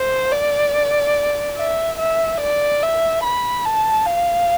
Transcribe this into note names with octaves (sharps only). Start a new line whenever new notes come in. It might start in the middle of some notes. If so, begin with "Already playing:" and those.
Already playing: C5
D5
E5
E5
D5
E5
B5
A5
F5